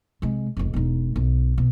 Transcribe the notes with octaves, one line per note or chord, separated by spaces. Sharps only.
C3 G#3
F1 C#2
E1 D#4
B1
B2